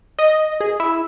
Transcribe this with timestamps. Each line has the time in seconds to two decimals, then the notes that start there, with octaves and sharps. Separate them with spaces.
0.19 D#5
0.60 G#4
0.80 E4